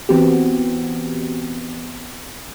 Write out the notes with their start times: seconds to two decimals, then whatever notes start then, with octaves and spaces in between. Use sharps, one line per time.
0.09 E3 B3 C4 F#4 G4